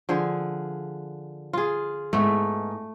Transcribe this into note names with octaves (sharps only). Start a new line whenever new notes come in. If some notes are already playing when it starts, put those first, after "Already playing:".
D3 F3 G#4
F4 G#4
G#2 A3 B3